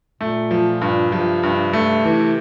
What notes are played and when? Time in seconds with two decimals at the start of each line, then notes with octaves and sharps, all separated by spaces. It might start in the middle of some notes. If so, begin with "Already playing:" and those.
0.21 A#2 A3
0.51 F3
0.81 G2
1.12 C3 F3
1.43 G2
1.73 A3
2.05 E3